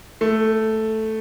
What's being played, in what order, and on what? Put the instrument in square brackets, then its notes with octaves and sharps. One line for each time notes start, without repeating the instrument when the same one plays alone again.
[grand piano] A3